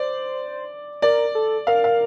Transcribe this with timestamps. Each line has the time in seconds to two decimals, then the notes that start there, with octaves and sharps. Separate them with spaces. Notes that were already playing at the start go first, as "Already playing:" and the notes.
Already playing: C5 D5
1.02 A#4 D5
1.35 A4
1.67 A#4 F5
1.84 F5